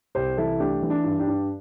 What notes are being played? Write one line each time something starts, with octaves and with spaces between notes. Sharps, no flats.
C2 G4 C5
E3 E4 A4
A3 D4 G4
E3
D4
G2
D4 G4
G2